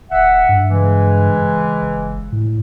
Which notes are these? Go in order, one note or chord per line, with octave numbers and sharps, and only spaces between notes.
D1 E5 F#5
G2
C#3 E3 G#3
F#1
A2